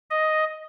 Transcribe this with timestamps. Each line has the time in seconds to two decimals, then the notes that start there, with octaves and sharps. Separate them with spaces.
0.11 D#5